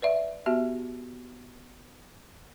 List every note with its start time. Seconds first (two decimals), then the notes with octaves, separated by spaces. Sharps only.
0.02 B4 D5 E5
0.46 B3 F#4 G4 E5